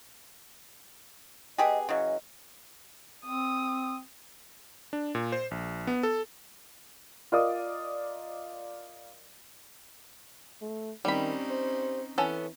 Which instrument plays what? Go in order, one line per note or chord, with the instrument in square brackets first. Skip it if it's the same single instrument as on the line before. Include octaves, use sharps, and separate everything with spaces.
[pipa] B3 G4 G#4 [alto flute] D#5
[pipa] C#3 E3 F#3 [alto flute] D#5
[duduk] C4 [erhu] D#6
[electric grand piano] D4
A#2
C5
A#1
B3
A4
[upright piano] F4 A#4 D5 D#5 D6 D#6
[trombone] A3
[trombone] D#3 [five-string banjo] G3 B5 [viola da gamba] C4 C#4 D#4
[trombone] C5
[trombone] E3 [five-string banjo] B3 C#4 A4